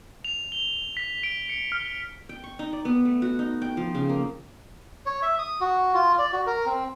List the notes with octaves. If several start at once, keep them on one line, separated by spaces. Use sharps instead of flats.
F7
G7
B6
D7
C#7
F6
G5
C#6
D#4
D5
B3
A3
F#4
D#4
G5
F3
C#3
A#3
C#5
E5
D#6
F#4
F4
D5
F#4
A#4
C4